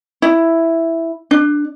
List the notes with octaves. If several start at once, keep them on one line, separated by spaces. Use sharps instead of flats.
E4
D4